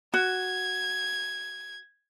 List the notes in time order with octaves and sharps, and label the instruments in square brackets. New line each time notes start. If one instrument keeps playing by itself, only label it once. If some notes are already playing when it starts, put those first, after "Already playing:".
[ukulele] F#4 [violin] G#6